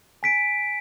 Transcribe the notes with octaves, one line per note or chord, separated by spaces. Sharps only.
G#5 B6 D7